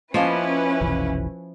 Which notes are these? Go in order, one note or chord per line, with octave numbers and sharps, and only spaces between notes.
F3 A#3 C#4 E4 B4 D#5 F5
F1 B1 E3